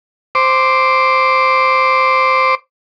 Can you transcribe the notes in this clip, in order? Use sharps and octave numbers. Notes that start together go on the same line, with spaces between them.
C5 D6